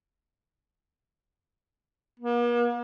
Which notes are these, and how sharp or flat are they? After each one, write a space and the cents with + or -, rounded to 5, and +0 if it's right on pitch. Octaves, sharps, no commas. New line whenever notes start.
A#3 +45